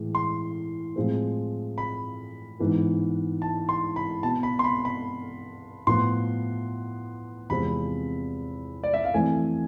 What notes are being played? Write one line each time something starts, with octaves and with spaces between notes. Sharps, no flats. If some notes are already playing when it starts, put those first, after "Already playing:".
Already playing: A2 E3 G#3
C6
A2 F3 G#3 C4
B5
G#2 E3 B3
A5
C6
B5
B2 B3 A5
B5
C6
B5
B5
A2 F3 B3 C6
E2 C3 F3 G#3 C4 B5
D5
E5
F5
F2 E3 A3 C4 G#5